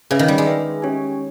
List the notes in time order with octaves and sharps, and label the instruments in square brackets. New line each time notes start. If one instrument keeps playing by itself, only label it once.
[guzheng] C#3 [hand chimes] G#4 B4 E5
[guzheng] D#3
G3
G#3
[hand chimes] G#4 B4 E5
C#4 G4 C#5 G#5